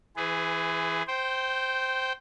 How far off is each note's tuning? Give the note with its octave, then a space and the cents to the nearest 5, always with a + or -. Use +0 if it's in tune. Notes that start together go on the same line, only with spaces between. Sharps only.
E3 +0 G#4 +0 B4 +40
C5 +0 G5 -15